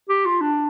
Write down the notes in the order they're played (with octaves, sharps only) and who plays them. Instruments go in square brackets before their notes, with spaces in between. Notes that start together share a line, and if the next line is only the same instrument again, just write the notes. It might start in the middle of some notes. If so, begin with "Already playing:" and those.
[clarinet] G4
F4
D4